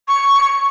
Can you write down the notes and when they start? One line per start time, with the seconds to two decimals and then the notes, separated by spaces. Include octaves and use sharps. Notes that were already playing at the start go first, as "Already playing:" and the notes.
0.07 C#6